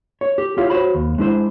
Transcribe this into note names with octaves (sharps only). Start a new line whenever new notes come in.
C#5
G4
E4 F4 G4 C#5
F#4 C5 C#5 B5
D#2
G#3 D4 E4 C5